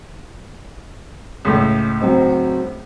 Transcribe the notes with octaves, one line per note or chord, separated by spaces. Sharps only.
C#2 A2
F#3 C4 D#4